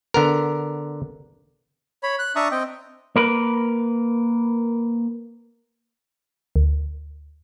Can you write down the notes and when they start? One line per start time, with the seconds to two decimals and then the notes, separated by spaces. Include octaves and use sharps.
0.14 D3 B3 A#4
2.03 C#5 B5
2.19 F#6
2.36 D4 E5 A5 A#5 C#6 D#6
2.51 C4 D#5 G5
3.16 A#3 A#4 B4
6.56 D2